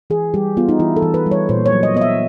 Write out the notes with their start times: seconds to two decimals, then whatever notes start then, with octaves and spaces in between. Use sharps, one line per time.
0.10 E3 G#4
0.34 G3 G4
0.57 B3 F4
0.69 D#4
0.79 E3 E4
0.96 A4
1.02 E3
1.14 B4
1.26 G3
1.31 C#5
1.49 A#2 C5
1.66 C#5
1.72 F#3
1.83 D#5
1.94 B3 D#5
2.01 E5